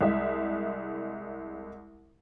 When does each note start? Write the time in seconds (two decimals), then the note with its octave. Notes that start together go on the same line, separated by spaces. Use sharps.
0.01 C2 G#3 E5